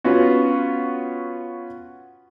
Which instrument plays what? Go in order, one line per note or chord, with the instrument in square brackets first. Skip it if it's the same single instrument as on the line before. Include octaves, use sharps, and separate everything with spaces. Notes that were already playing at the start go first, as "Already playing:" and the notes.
[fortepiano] B3 C#4 F4 F#4